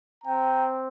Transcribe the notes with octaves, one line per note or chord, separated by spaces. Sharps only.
C4 G5 A#5